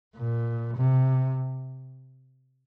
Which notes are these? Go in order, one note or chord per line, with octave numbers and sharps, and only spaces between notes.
A#2
C3